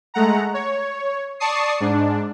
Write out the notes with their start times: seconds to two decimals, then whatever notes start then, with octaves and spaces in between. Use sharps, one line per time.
0.14 G#3 A3 F#5 A#5
0.54 C#5
1.40 D5 A5 C#6 D#6 C7
1.80 G#2 D4